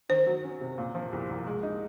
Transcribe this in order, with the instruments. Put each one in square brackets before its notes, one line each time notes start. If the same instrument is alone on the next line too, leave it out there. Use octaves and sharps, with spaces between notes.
[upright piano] D#3 [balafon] C5
[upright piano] F#3
C#4
C3
A#2
F3
C2
C2
G#3
D#4